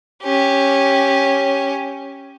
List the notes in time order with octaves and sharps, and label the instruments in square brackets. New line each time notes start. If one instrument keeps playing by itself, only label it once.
[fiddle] C#4 G4